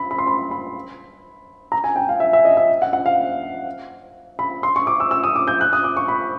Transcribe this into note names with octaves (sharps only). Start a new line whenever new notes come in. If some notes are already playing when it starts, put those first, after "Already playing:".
Already playing: B5
B5
C6
B5
B5
A#5
G#5
G5
F5
E5
E5
D#5
E5
F#5
F#5
F5
B5
C6
C#6
D6
E6
E6
D#6
D6
G6
F#6
D#6
D6
C#6
B5